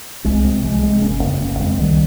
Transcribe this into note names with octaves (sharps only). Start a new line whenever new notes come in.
C2 G#3 C4
C3 G#3 C4
C2 F3 G#3
C3 G#3 C4
G1 A#3 C#4
F2 C#3
G1 A#3 C#4
F2 C#3 G#3 C4
C2 D#3 G3